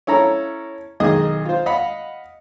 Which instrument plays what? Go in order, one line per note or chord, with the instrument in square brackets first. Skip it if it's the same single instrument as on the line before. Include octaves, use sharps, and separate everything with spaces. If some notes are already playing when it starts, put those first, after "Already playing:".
[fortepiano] C#4 E4 A4 A#5
B1 D#3 G#4 D#5 D#6
F4 C5
D#5 F5 F#5 B5